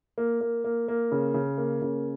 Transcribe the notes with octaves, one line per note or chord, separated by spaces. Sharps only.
A#3
A#3
A#3
A#3
C#3
C#3
A#3
C#3